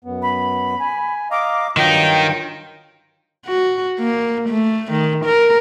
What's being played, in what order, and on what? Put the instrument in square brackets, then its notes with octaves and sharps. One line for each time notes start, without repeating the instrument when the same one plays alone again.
[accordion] F#2 B3
[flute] B5
[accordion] G#5
[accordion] D#5 F5 A#5 [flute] D6
[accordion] G2 F#3 F4 [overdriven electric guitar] D#3 D#4 [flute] G5
[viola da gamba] F#4
A#3
A3
D#3
A#4